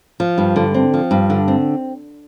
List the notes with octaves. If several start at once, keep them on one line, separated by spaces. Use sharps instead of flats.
F3
G2
D3
C4
F3
G2
D3
C4